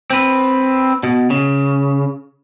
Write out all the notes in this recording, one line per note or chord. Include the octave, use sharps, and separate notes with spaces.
C4 B4
B2
C#3